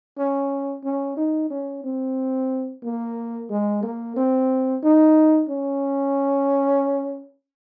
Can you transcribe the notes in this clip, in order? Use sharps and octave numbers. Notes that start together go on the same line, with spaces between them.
C#4
C#4
D#4
C#4
C4
A#3
G#3
A#3
C4
D#4
C#4